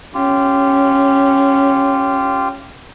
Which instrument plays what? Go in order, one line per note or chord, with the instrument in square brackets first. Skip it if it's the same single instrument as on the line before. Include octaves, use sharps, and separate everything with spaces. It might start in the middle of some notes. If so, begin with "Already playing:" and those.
[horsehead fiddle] C#4 [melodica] F4 G4